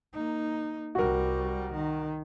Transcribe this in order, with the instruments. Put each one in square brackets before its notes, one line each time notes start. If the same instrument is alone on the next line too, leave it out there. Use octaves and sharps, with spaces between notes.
[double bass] A#3 D#4
[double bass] C2 G3 [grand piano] F#4 A#4
[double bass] D#3